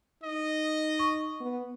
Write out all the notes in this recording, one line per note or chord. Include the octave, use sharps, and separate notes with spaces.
D#4 D#5
C#6
B3